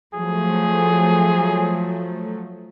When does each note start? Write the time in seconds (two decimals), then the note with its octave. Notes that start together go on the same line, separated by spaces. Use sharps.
0.14 F3 F#3 A3 G#4